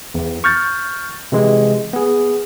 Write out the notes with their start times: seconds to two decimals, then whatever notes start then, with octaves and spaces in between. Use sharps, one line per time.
0.14 E2
0.44 C#6 F6 G6 A6
1.32 C3 E3 G#3
1.93 B3 G#4